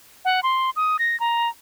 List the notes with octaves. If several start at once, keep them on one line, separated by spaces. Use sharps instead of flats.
F#5
C6
D#6
A#6
A#5